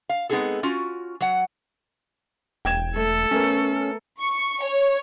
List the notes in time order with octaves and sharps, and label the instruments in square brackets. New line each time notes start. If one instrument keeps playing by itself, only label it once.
[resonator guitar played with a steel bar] F5
G#3 B3 C4 D#4 G#4 A4
C#4 F4 F#4
F#3 F#5
[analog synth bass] E1 [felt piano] G5 G#6 E7
[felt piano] A3 [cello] A4
[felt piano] A3 B3 A#4 [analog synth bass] C#4
[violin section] C#6
C#5